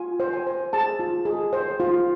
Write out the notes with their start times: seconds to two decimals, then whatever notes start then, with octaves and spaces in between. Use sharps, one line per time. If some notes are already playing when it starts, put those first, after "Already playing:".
Already playing: F4 G#5
0.20 C5
0.33 G#5
0.47 C5
0.73 G#4 A5
0.99 F4
1.25 G#4
1.53 C5
1.80 F4